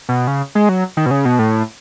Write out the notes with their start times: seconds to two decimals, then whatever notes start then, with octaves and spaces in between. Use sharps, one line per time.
0.09 B2
0.27 C#3
0.55 G#3
0.69 F#3
0.97 D#3
1.06 B2
1.11 C#3
1.25 B2
1.39 A2